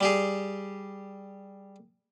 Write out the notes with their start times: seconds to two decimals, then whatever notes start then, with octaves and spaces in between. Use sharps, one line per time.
0.01 G3 G4 G#4